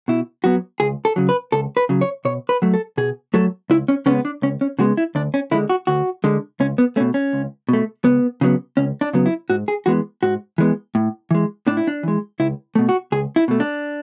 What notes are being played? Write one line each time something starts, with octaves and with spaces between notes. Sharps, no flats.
B2 E4
F#3 B3 F#4
C#2 G#4
A4
C#3 F#3
B4
C#2 A4
B4
C#3 F#3
C#5
B2 C#5
B4
F#3 A3
A4
B2 G#4
F#3 A3 A4
C#2 E4
C#4
C#3 G#3 B3 C#4
D4
C#2 C#4
C#4
C#3 G#3 B3 F#4
E4
D2 D4
C#4
D3 G#3 E4
F#4
D2 F#4
D3 G#3
C#2 C#4
B3
B2 A3 C#4
C#4
C#2
B2 A3
C#2 B3
C#3 F#3 B3
C#2 C#4
D4
C#3 F#3 B3
E4
G#2 F#4
G#4
E3 G#3 B3 F#4
G#2 F#4
E3 G#3 B3
A2
E3 G#3
A2 D4
E4
D4
E3 G#3
C#2 E4
B2 A3
F#4
C#2 G#4
E4
B2 A3
D4